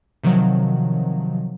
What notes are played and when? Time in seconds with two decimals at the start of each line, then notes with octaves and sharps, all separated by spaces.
0.24 C3 D#3 F3 F#3